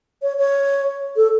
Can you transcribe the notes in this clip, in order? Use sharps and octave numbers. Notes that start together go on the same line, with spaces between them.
C#5
C#5
A4